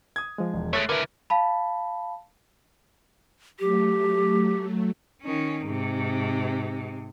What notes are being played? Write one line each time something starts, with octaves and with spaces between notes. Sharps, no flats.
D#6 G#6
F3 G#3
E1
G#3 A3 A4 C#5 E6 F#6 A6
D3 E4 A#4 B4 F6 G#6
F5 A5 B5
F#3 A3 G4
D#3 C#4
G#2 C3